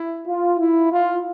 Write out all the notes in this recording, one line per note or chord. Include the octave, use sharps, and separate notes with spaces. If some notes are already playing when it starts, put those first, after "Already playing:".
Already playing: E4
F4
E4
F4